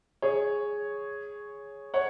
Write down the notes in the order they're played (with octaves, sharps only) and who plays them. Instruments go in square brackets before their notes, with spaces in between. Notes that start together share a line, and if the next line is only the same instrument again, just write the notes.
[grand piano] G#4 C#5
C#5 F#5